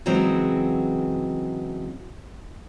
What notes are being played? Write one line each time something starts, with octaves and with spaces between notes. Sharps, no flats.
C#3 E3 F#3 G#3 C4 F#4